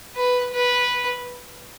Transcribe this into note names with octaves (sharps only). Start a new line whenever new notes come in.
B4
B4